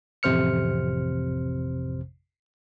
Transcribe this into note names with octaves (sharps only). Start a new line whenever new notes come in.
A1 F2 C3 C5 F6 C#7